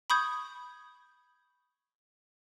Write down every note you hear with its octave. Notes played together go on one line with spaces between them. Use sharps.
B5 C#6 D#6 G6 G#6